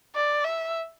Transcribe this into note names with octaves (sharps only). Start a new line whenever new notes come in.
D5
E5